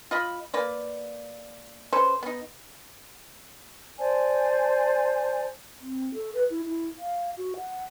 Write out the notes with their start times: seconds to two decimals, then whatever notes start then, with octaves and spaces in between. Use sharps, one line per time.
0.11 F4 D#5 B5
0.54 A#3 B4 D5
1.93 C#4 A4 B4 C5
2.23 B3 D#4
3.98 C5 D5 G#5 A5
5.81 C4
6.14 A4
6.34 B4
6.50 E4
6.64 E4
6.99 F5
7.37 F#4
7.57 F#5